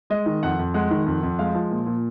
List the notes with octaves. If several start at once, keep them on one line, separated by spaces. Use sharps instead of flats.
G#3 D#5
D#3
F2 F#5
F2
G#3 F#5
D#3
F2
F2
G#3 F5
F3
A#2
A#2